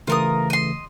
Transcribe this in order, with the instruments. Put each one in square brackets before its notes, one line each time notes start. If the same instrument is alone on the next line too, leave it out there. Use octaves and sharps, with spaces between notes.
[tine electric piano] C#3 E3 A3 [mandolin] F4 A#4 D#6
[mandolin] D#5 C6